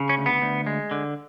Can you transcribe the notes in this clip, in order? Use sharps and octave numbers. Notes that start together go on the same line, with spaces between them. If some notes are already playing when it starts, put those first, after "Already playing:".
Already playing: C#3
C#4
D2
B3
D2
G#3
D3